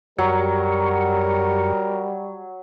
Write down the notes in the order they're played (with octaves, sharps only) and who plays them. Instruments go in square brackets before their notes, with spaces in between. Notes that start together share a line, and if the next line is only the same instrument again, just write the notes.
[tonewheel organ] F#2 G4 C#6 [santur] F#3 [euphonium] G3 [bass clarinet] A#4